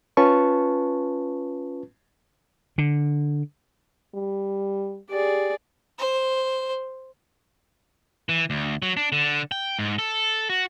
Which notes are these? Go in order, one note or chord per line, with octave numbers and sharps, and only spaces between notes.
C#4 F4 B4 A5 C#6
D3
G3
G4 G#4 D5
C5
E3
D2
F#3
D4
D3
G5
G#2
A4
F#4